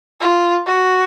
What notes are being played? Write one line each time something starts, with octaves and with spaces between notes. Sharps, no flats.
F4
F#4